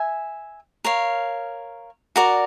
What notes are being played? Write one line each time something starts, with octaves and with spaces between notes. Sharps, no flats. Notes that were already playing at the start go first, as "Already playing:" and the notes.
Already playing: E5 G#5
A#4 C#5 F5
F#4 A#4 D5